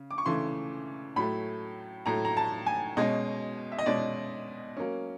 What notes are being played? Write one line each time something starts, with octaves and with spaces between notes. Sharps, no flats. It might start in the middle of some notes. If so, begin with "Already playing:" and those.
Already playing: C#3
D6
C#6
C#3 E3 A3 C6
A2 F#3 A3 B5
A2 F#3 A3 A#5
A#5
A5
G#5
B2 G#3 C#4 D#5
E5
D#5
B2 G#3 C#4 D5
F#3 A#3 C#4